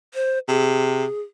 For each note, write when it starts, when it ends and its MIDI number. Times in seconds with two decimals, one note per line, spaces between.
0.14 0.39 72
0.48 1.06 48
0.48 1.21 68